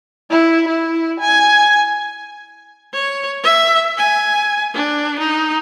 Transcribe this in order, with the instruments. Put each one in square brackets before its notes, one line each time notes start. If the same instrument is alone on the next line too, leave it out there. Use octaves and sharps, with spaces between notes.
[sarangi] E4
E4
G#5
[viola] C#5
E5
G#5
D4
D#4